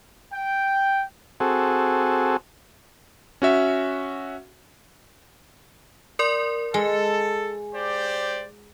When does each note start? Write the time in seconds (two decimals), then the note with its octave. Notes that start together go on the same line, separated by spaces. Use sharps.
0.33 G5
1.40 C4 F#4 G#4 A4
3.42 C#4 F#4 E5
6.19 A#4 D5 C6
6.74 G#3 A4 G#5
7.75 G4 C5 D5